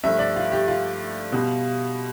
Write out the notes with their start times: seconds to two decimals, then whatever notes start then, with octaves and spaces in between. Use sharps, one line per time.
0.04 G2 F3 A3 E5
0.19 D5
0.36 F4
0.52 G4
0.68 F4
1.32 B2 G3